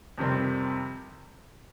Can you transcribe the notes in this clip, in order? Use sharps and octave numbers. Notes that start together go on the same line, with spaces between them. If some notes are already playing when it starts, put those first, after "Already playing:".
F2 C3 D#3 G3 C4